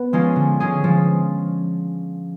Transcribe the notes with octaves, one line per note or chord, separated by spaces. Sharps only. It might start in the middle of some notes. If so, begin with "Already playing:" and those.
Already playing: B3
F3 G#3 C#4 F4
D3
G#3 C#4 G#4
F3